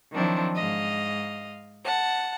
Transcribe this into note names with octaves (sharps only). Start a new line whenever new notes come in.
D#3 F3 F#3 C4 D4 E4
G#2 D#5 F5
F#5 A5